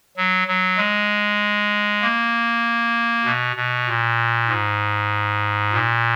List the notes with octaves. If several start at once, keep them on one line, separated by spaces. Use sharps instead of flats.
F#3
F#3
G#3
A#3
B2
B2
A#2
G#2
A#2